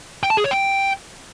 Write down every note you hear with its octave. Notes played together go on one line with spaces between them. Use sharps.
G5
A5
G#4
C#5
G5